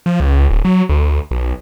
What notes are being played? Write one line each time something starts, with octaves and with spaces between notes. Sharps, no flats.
F3
C#2
D1
F#3
D2
B1